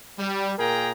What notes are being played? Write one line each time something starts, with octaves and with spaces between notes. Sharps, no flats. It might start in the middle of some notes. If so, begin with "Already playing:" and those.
G3
A#2 G#4 A#4 G5 A#5